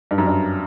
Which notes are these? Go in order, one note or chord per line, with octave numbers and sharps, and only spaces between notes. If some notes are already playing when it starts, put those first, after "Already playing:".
G2
F#2
G2